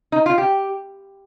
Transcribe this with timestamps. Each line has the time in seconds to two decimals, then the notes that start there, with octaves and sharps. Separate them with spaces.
0.12 D#4
0.26 F4
0.38 G4